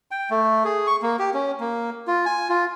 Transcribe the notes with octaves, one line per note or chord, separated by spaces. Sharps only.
G5
A3
G#4
C#6
A#3
G4
C#4
A#3
F4
G#5
F4